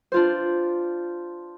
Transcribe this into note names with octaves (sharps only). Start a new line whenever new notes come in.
D4 F4 C5